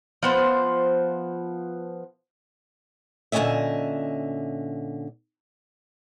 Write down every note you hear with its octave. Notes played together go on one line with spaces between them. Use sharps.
F3 B3 C5
A#2 D3 F#3 C#4 D#5 E5